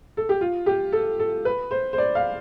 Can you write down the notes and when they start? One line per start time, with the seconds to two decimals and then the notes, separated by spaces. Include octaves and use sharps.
0.17 A4
0.29 G4
0.41 F4
0.66 G4
0.92 A4
1.19 A4
1.45 B4
1.71 C5
1.93 C5
1.98 D5
2.15 F5